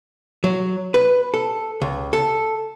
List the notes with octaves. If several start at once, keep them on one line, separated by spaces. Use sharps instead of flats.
F#3
B4
A4
C#2
A4